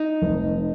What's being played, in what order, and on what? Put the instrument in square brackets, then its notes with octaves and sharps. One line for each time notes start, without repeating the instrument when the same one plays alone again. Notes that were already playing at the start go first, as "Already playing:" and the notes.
Already playing: [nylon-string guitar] D#4
[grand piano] F1